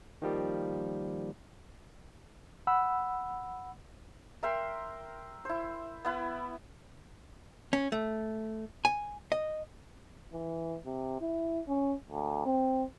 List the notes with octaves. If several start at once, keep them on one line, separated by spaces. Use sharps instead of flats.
D#3 F3 G3 A#3
F#5 B5 E6
A#4 E5 G5 C6
E4 C5
B3 E4 B4
C#4
A3
G#5
D#5
E3
C3
E4
C#4
D2
C4